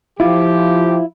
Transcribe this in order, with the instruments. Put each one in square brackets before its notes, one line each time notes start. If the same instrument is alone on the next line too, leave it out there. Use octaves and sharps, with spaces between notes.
[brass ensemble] F3 G4 [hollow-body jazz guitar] E4 F4